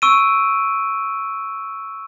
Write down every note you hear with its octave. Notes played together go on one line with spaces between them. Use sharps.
C#6 E6 D7 D#7